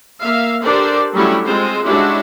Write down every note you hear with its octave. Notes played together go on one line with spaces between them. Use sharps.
A#3 E5 F5
D4 G4 A4 A#4 C5 D5
F#3 G3 A3 C#4 E4 G4
G#3 C4 F4 C5
G#3 C#4 D4 E4 F#4 G4